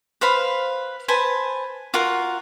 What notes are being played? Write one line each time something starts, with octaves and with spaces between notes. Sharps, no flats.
B4 C5 F5 B5
B4 C5 G#5 A5
F4 F#4 A#4 F#5